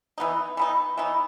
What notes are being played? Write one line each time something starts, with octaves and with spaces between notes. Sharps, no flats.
E3 B3 D#4
E3 B3 D#4
E3 B3 D#4